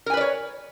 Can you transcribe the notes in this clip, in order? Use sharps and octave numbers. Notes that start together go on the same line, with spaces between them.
A#4 B4 C#5 D5 G#5